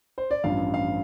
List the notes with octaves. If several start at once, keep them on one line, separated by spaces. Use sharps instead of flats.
C5
D5
A1 G2 F3 F5
F5